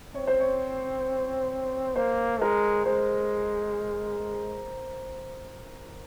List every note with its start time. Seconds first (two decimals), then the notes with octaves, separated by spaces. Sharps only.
0.15 C4 C#5
0.27 C5
0.40 C#5
1.96 A#3 C5
2.41 G#3 A#4
2.86 G#3 C5